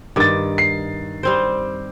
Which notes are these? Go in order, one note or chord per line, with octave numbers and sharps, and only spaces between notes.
G2 D#3 D6 A6
C7
G3 C4 C5